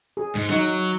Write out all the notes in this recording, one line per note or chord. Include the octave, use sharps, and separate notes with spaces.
G#4
G#2
F#3 D#4